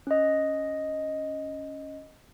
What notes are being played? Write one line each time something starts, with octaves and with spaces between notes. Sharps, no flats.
C#4 D#5